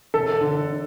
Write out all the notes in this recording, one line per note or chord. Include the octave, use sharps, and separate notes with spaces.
E1 A4
D3